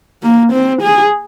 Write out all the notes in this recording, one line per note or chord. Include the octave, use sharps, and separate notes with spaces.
A#3
C4
G#4